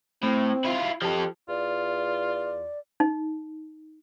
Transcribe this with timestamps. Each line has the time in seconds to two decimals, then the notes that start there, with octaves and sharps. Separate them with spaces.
0.23 A2 C4
0.64 E4 F4
1.02 F3 G4 A4
1.49 E2 F4 D5
3.00 D#4